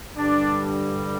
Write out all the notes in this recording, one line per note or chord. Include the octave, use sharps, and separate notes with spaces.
G2 D3 G3 D4